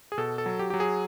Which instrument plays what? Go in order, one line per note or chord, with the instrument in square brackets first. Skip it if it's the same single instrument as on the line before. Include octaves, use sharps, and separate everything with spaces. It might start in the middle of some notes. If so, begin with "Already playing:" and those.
[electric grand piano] G#4
B2 A4
A4
F#3
G4
F#3 G4
G#4